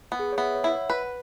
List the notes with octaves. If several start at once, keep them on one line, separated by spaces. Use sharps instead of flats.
B3
G#4
C#5
B3 E5
C#5
E4
F#5
B4